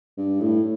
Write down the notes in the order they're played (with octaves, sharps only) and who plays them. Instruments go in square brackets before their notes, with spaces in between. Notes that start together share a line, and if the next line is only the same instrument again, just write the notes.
[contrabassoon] G2
A2